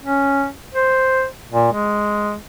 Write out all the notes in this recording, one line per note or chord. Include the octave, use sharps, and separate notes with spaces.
C#4
C5
A#2
G#3